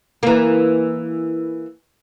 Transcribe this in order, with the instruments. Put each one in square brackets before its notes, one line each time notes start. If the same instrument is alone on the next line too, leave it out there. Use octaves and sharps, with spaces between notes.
[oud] E3 A#3